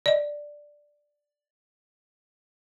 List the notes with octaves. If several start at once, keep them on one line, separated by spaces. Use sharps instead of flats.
D5 D#5